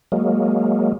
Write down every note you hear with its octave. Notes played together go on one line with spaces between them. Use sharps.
F#3 G#3 A#3